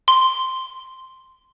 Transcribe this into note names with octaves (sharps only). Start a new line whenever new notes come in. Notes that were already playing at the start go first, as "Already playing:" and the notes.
C6